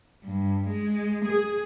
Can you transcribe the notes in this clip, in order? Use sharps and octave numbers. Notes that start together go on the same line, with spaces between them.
G2
G#3
G#4